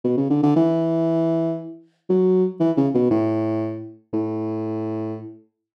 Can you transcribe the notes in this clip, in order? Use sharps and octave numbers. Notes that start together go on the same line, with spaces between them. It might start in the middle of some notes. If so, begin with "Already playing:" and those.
B2
C#3
D3
D3
E3
F#3
E3
C#3
B2
A2
A2